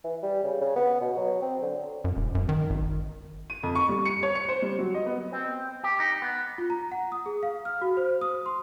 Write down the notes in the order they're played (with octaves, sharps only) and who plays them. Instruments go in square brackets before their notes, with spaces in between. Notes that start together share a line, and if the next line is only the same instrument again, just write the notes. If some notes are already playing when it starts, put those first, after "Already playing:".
[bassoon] E3
G3
C#3
C#3
B3
B2
F#3
C4
D3
[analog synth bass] F#2
E1
F#2
D#3
G#1
[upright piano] D#7
F2
C#6
G3
C#7
C#5
C#7
C5
G3
F#3
D#5
B3
[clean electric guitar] C4
G4
D#4
B3
[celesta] F4
A#5
F#5
D#6
G#4
F5
F6
F#4
C5
D#6
C6